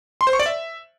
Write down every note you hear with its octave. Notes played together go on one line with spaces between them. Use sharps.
C6
C5
C#6
D5
E5